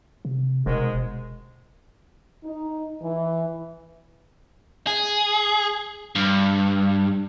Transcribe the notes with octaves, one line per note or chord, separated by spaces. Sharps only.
C3
F1 G#2 B2 D#3 G#3
D#4
E3
G#4
G2